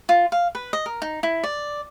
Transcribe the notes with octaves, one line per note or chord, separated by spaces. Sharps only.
F4
F5
B4
D#5
A#4
D#4
E4
D5